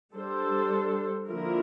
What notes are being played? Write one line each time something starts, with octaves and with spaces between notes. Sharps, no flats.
G3 D4 A4 C5
D3 F3 A#3 E4 A#4